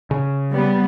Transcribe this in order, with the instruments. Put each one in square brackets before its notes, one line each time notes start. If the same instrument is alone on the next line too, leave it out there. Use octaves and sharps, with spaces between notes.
[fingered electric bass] C#3
[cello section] G3 B3